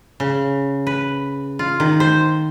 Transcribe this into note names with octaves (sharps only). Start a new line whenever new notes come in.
C#3
B4
F4
D#3
C5